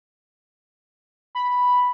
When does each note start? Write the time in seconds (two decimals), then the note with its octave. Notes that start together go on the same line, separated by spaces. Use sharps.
1.35 B5